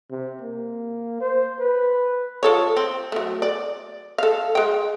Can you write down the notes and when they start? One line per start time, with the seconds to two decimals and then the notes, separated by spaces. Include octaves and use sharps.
0.11 C3
0.41 A#3
1.21 C5
1.60 B4
2.43 F3 A4 C#5
2.76 C4
3.12 F#3 A3
3.42 D5
4.18 A4 F5
4.55 G#3 G5